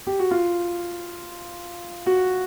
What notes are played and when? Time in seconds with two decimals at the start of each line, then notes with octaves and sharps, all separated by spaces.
0.07 G4
0.19 F#4
0.31 F4
2.06 F#4